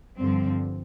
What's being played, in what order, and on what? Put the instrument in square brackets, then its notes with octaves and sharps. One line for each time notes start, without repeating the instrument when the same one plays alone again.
[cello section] G2 D3 F3 C4